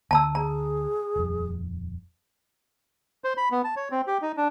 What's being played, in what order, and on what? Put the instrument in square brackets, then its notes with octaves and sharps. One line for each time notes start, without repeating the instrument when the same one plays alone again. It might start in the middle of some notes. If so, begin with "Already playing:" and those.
[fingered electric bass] D2 D3 [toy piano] A5 A#5 E6
[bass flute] G#4 [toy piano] A#5
[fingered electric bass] D#1 F2
[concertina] C5
B5
B3
A5
C#5
C4
G4
D#4
D4